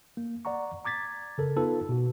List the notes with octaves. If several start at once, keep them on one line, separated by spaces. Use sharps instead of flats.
A#3
D5 F#5 A#5 C#6
A#5 D6 G#6 A6 B6
C#3 A4 A#4
B3 D#4 F4 A4 B4
B2 F#4